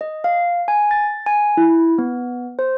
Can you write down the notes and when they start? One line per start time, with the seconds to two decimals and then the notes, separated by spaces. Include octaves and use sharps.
0.01 D#5
0.24 F5
0.68 G#5
0.91 A6
1.26 G#5
1.57 E4
1.98 B3
2.59 C5